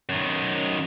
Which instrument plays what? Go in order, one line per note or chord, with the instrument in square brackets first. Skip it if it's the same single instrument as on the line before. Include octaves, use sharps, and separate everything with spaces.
[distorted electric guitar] F#2 D#3